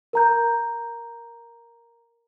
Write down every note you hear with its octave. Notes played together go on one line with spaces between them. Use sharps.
A#4 A#5 G6